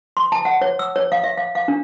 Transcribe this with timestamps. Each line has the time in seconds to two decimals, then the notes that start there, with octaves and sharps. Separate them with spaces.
0.17 C6
0.32 A5
0.45 F#5
0.61 C#5
0.79 E6
0.96 C#5
1.12 F5
1.24 E5
1.38 F5
1.55 F5
1.68 D4